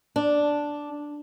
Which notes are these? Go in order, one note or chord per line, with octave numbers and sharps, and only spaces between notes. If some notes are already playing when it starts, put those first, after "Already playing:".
D4